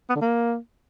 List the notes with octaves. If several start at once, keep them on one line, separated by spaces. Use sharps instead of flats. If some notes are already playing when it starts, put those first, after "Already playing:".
B3
D3
A#3